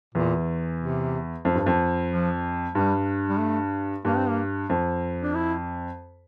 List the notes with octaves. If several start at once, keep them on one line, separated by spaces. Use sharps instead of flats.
E2 A#2
C3
F2
G2
F2
F3
G2 G3
G3
A3
G2 A#3
C4
A#3
F2
D4
E4